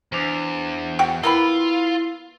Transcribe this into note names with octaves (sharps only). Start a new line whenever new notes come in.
E2 D4 C5
F#4 G5
A#3 B3 E4 F4 B5